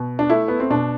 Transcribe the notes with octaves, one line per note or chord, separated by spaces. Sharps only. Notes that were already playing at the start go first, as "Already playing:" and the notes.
Already playing: B2
D4
A3 E4
B3
C4
B2 D4